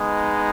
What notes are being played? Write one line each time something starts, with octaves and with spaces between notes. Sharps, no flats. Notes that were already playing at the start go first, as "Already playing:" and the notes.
Already playing: G#3 B3 D#4